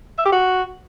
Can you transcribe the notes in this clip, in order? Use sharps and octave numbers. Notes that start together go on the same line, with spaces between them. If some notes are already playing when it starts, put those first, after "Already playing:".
E5
G4
F#4